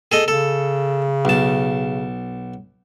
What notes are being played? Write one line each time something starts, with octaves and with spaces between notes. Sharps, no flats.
G#4 A4 D#5
C#3 A4
B1 A5